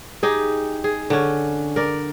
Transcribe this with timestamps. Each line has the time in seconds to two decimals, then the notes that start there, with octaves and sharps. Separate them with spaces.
0.23 D#4 G4 G#4
0.84 G#4
1.10 D3 C#4
1.76 A#4 D5